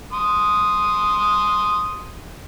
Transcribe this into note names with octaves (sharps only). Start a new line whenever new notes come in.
C6 D#6